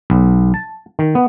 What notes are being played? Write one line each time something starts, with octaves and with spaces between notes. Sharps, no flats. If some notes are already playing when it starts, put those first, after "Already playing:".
B1
A5
D#3
B3